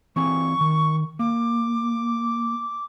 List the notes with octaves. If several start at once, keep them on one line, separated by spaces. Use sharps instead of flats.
E3 C4 G#5 C#6
D#3
A#3 D6